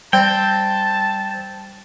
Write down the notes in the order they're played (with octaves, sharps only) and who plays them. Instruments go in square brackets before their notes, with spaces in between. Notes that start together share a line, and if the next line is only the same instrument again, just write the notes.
[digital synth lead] G3 [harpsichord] C4 [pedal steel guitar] G5 [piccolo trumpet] A5